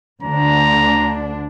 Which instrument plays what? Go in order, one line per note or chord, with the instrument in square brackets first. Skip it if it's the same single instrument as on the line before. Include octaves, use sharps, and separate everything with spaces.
[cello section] D2 D3 D4 [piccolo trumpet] A#5